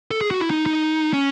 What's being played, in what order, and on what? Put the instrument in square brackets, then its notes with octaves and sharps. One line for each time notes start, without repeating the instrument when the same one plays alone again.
[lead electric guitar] A4
G#4
F#4
E4
D#4
D#4
C#4